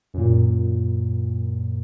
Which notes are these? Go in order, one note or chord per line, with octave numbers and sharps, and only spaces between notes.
F#2 A#2